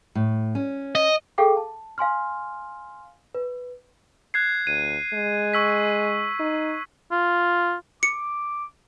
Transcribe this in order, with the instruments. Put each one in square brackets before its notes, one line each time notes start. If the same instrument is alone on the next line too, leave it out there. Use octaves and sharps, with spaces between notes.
[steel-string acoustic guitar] A2
C#4
[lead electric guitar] D#5
[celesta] G#4 A4 F5 G5 D6
A5
F5 G#5 C6 F6
B4
[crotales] F#6 G#6 C7
[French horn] D2 [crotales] D#7
[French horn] G#3
[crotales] C#6 E6 B6
[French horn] D#4
[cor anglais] F4
[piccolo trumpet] D6 [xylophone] C#7